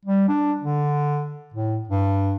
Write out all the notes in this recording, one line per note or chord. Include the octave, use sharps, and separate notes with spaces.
G3
D4
D3
A2
G2